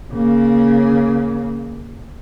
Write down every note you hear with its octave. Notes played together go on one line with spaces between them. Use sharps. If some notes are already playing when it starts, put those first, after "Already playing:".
C#3 A#3